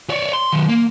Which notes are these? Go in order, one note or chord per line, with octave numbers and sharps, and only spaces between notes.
C#5 D5
C6
D#3 F#3
A#3